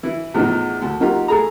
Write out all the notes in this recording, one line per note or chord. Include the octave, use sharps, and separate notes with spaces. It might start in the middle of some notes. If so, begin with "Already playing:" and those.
E3 E4
E2 A2 E3 F3 D#4
D2 A5
F#3 A#3 D#4 F4 G4
A3 G#4 A#5